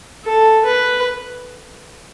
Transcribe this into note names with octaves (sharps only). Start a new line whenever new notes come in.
A4
B4